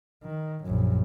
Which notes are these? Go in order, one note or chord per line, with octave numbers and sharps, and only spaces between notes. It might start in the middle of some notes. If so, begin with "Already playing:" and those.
D#3
A#1 F#2